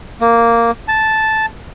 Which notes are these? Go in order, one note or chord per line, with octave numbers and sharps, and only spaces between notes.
A#3
A5